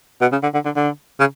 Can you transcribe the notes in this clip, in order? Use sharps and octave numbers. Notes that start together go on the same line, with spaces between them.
B2
C#3
D3
D3
D3
D3
C#3